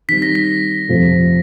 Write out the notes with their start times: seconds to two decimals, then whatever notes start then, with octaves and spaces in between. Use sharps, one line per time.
0.08 D#3 G3 C4 B6
0.22 A#6
0.35 B6
0.88 F2 C3 F3 A3